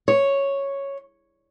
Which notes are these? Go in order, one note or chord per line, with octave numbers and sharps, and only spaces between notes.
C#5